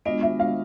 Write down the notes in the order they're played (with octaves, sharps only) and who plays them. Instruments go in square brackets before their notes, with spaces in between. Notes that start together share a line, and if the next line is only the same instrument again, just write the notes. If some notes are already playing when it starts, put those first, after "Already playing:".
[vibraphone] G#3 B3 D4 F4 [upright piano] D#5
[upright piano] E5
F5